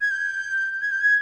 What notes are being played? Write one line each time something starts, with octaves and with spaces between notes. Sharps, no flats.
G#6
G6
G#6
G6
G#6